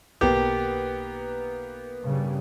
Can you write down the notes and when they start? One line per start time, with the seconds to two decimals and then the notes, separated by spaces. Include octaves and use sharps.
0.21 B1 D#3 A#3 B3 G4
2.03 G2 C#3 G3